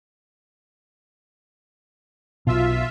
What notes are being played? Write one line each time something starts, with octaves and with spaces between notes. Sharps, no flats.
B1 B2 F4 E5